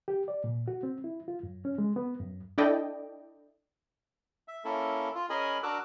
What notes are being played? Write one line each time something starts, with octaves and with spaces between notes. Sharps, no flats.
G4
D5
A#2
F#4
C4
E4
F4
F#2
C#4
G#3
B3
F#2
D4 E4 A4 D5 D#5 G5
E5
A#3 C#4 E4 A4
F4
C#4 G#4 A#4 D#5 G#5 B5
D4 F#4 A#4 D6 E6 F#6